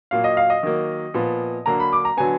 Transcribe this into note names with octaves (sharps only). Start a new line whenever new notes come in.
A#2 F#3 A#3 F5
D#5
F5
D#5
D#3 F#3 A#3
A#2 F3 B3
D3 F#3 A#3 A#5
B5
D6
A#5
D3 F#3 B3 G#5